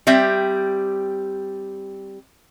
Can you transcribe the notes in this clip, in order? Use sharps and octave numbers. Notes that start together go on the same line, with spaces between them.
G3 C4 G4 E5